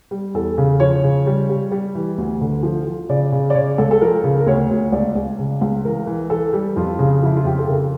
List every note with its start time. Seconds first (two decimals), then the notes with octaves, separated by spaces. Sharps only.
0.11 G3
0.34 E2 A4
0.58 C#3
0.80 F3 C#5
1.03 C#3
1.27 G3
1.49 G3
1.72 G3
1.95 E3
2.18 D2
2.41 D3
2.63 F3
2.86 F3
3.09 C#3 D5
3.32 C#3
3.50 D5
3.55 C#3 C#5
3.78 C#2 A4
3.91 A4
4.01 F3 A#4
4.24 C#3
4.40 A#4
4.46 D2 C#5
4.71 D2
4.92 C#2 D5
5.15 C#2
5.39 C#3
5.61 C#2
5.85 E3 A#4
6.07 E3
6.30 E3 A4
6.53 G3
6.76 F2 F4
6.99 C#3
7.23 F3 E4
7.36 F4
7.45 F2 G4
7.58 A4
7.68 C#3 A#4